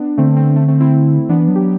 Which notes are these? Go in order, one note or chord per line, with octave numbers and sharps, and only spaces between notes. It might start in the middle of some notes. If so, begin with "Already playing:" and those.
Already playing: B3 D4
D3 A3 C4
A3 C4
A3 C4
A3 C4
C4 E4
E3 B3 D4
F#3
G4